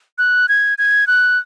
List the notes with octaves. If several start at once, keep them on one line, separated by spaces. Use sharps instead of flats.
F#6
G#6
G#6
F#6